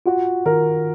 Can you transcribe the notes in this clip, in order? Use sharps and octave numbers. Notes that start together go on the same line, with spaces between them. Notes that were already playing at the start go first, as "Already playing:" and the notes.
F4 F#4
D#3 A#4